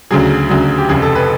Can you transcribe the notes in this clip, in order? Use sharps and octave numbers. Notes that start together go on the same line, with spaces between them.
D2 C#3 F#3 G#4
D2 C#3 F#3
G4
F1 F2 C#3 G#4
A4
B4